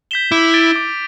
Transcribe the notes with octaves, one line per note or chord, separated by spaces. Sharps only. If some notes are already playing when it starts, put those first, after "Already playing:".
G6 B6 E7 G7
E4 D6
A6 D7 G7
D6